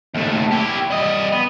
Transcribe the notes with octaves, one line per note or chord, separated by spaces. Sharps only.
D#2 A3
E4 G4
G3 D#5
B3